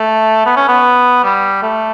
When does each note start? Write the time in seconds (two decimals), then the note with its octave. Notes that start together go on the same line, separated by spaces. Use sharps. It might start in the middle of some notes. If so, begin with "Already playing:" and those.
Already playing: A3
0.46 B3
0.56 C#4
0.69 B3
1.24 G3
1.63 A3